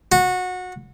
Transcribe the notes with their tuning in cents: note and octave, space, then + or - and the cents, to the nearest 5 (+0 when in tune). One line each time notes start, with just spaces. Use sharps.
F#4 -20